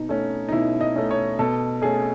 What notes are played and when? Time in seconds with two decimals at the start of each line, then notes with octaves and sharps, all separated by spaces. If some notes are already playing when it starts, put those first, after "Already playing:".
Already playing: B2 D#4
0.09 A3 C#4
0.49 D#4
0.52 B2 E4
0.81 D#5
0.96 A3 C#4
1.11 C#5
1.39 B2 A4
1.82 A3 C#4 G#4